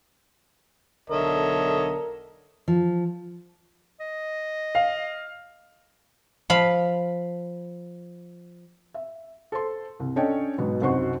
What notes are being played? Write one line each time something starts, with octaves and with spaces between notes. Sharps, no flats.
B1 D3 A4 A#4 C#5 D#5 E5
F3
D#5
F5
F3 F5 B5
E5
A4 C5 C6
C2
C#4 D4 A4 C#5 D#5 G5
G#2 B2 F#3 B3
C2 F#2 D#4 C5 F#5 C#6